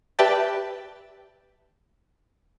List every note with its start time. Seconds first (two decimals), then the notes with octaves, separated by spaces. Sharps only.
0.19 G4 B4 D5 E5 G5 A5